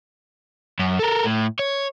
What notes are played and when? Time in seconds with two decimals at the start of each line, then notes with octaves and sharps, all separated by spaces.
0.79 F#2
0.99 A4 A#4
1.24 A2
1.59 C#5